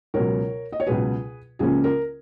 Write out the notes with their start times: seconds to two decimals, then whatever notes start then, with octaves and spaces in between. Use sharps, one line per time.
0.14 C#2 B2 F#3 A#4 C#5
0.72 D#5
0.80 C#5
0.87 C#2 B2 F#3 G#4 B4
1.59 C#2 C#3 F3 A#3 C#4 G#4
1.84 A#4